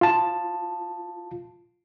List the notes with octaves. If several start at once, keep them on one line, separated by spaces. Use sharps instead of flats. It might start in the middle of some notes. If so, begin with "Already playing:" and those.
F4 A5